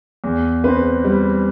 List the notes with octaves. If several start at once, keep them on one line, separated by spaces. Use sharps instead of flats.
E2
C4 B4
G3